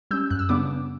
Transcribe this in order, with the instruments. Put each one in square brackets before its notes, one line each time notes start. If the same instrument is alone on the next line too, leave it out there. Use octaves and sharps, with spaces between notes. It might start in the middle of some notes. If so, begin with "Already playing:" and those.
[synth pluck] G3 C#4 E6 G6
F#2 F#6
E6
C#3 G3 B3 D4 D6